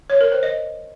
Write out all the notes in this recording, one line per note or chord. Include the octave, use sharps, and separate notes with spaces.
C#5
A#4
C5
D#5